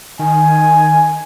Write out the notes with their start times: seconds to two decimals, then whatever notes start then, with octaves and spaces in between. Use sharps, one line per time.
0.19 D#3 G#5